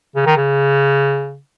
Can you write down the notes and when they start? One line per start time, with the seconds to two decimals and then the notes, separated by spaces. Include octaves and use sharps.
0.16 C#3
0.26 D#3
0.37 C#3